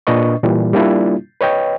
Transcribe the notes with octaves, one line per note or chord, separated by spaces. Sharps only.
A#2 D4 B4 D#5 C#6
A#2 E3 G3
G3 A#3 D4 E4 F4
B4 C#5 D#5 G5